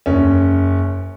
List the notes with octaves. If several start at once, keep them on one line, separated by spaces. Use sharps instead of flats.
F#1 C#4